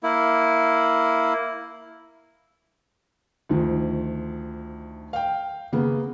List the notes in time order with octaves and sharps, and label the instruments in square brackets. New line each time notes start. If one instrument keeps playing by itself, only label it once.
[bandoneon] A#3 E4
[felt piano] D2 D#3 F3
F5 G5
C#3 A#3 B3